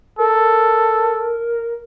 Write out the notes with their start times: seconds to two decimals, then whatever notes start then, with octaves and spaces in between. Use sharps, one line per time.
0.19 A4 A#4